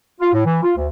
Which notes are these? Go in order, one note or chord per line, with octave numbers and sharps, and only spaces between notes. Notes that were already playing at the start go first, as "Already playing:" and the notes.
F4
A2
E3
F4
D2